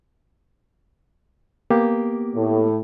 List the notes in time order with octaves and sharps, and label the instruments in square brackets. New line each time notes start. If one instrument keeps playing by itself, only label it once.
[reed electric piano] A#3 B3 G4
[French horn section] A2